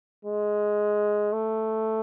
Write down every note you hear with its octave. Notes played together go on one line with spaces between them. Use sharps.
G#3
A3